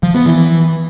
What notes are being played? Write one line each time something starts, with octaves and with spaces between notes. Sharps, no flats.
F3
B3
E3